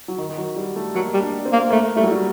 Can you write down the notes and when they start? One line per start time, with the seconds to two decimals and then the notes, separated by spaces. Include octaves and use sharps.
0.08 F#3
0.18 D#3
0.29 D#3
0.38 F#3
0.56 G3
0.76 A3
0.95 F#3 A#3
1.13 G3
1.20 D4
1.45 C4
1.53 A#3
1.70 A3 A#3
1.96 G3 A3
2.03 F#3
2.11 G3